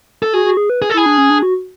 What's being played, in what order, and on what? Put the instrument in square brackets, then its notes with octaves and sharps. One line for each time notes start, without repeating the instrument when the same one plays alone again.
[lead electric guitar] A4
[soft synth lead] F#4 [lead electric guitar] G#4
[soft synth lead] F#4
G#4
B4
[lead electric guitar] G#4
A4
[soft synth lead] E4 [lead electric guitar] G#4
[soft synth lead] D4
C#4
D4
F#4